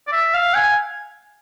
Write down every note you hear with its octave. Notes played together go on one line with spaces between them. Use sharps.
D5
E5
F5
G#5